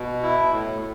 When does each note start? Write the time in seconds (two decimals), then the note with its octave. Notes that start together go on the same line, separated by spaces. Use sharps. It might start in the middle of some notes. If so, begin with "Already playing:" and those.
Already playing: B2
0.23 E4
0.52 A2